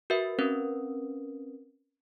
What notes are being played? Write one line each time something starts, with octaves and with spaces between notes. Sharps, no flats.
F#4 A#4 B4 E5
C4 C#4 A#4 B4